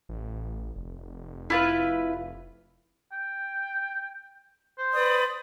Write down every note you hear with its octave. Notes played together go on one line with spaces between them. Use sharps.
A1
F1
E4 F4 B4
G5
C5
B4 D5 D#6